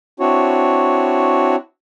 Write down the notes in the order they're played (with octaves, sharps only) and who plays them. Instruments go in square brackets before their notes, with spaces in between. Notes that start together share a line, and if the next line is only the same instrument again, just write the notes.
[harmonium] C4 D4 E4 F#4 C#5